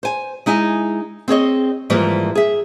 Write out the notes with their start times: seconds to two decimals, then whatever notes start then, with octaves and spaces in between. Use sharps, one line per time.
0.03 C5 G#5
0.46 G#3 D#4 E4 G#5
1.28 C4 G#4 C#5 D#5
1.90 G#2 E3 F3 G3 A#3
2.35 G#4 E5